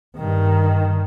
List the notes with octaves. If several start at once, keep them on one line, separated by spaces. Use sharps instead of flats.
G2 D#3